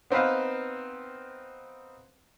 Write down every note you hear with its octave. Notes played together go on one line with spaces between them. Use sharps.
B3 C4 D#4 B4 F5